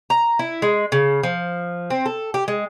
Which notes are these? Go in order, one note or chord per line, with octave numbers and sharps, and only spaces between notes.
A#5
E4
G#3
C#3
F3
C4
A4
G4
G#3